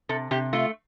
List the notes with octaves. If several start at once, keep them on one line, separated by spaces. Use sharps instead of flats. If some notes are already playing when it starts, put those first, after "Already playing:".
C3 A4
C3 G4
A3 F4